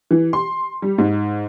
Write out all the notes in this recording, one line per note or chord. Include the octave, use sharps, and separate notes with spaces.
E3
C6
G3
G#2